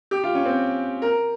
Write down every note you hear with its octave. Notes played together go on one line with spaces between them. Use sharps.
G4
F4
C#4
C4
A#4